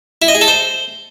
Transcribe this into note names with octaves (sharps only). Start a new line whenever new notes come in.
E4
D#5
G#4
A4
C5